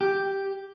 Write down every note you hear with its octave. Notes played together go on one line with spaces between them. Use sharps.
G4